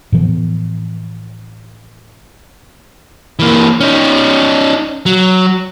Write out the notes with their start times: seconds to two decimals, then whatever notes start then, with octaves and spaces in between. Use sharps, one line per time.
0.12 A2 E3 F3 B3
3.39 E3 A#3
3.80 C#4 D#4
5.06 F#3